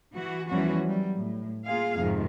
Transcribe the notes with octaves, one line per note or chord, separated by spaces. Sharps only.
E3 F#4
E2 E3 F3 G3 C#4 F#4
F#3 G3
A2
A#3 F4 G#4 F5
F2 G#2 C3 D#3